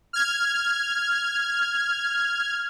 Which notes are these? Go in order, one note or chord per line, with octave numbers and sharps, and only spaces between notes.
F6 G#6